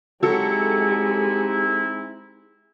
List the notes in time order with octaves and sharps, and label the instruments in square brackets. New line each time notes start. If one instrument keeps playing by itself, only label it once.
[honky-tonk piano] F#3 A4 [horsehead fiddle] G#3 [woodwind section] C4 D#4 E4 [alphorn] G4